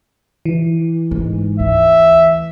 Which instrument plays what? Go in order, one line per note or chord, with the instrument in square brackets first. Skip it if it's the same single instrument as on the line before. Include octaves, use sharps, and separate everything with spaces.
[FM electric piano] E3
[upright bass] G#2 G#3
[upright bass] D2 [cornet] E5